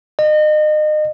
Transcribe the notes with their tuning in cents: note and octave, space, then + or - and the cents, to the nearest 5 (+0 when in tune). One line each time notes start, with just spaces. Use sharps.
D#5 -35